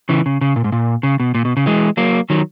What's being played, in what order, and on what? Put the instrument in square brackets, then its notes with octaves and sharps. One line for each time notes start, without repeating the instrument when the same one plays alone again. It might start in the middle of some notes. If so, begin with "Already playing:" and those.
[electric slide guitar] C#3 E3
C#3
C#3
A#2
G#2
A#2
C#3
B2
A#2
B2
C#3
E3 G#3
F#3 A#3
D#3 F#3